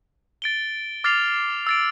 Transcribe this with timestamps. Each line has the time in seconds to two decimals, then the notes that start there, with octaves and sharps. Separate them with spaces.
0.42 A6 D7 G7
1.04 D6 F6 A6 C7 F7
1.67 E6 A6 D7